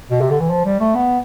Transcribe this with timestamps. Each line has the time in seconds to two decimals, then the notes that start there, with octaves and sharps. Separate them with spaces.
0.11 B2
0.21 C3
0.30 D3
0.40 E3
0.50 F3
0.65 G3
0.80 A3
0.95 B3